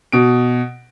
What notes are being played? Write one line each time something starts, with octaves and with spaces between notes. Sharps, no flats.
B2 D7